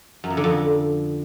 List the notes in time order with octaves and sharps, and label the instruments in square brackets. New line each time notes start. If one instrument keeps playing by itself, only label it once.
[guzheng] F#2
F2
D3
F2